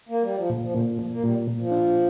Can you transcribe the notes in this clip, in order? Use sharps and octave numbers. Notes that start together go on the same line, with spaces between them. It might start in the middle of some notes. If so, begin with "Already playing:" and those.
A#3
G3
F3
A#2 D3
F3
A#2 D3
A#2 F3
A#3
A#2 G3
A#2
F3
D4